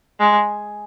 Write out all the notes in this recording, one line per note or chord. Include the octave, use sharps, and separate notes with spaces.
G#3